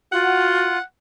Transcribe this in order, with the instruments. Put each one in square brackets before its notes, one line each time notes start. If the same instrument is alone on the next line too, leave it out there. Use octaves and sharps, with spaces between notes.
[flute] F4 [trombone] F#4 [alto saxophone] F#5